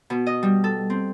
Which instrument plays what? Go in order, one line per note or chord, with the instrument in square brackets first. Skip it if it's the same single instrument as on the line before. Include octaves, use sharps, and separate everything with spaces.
[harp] B2
D#5
G3
A4
C4